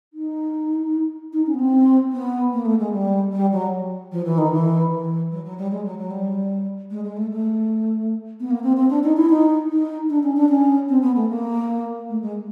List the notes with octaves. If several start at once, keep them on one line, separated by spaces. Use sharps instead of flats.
D#4
D#4
C#4
B3
C4
B3
A#3
A3
G#3
G3
G3
F#3
F3
E3
D#3
E3
E3
F#3
F#3
G3
G#3
F#3
F#3
G3
G#3
G#3
A3
A3
B3
A#3
C4
C4
D4
D#4
E4
D#4
D#4
D4
C#4
D4
C#4
C4
B3
A3
A#3
A3
G#3